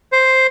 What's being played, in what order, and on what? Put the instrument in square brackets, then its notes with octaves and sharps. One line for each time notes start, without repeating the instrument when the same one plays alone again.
[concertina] C5